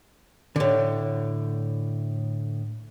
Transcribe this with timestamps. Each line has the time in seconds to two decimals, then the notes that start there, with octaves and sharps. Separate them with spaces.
0.56 A2 D3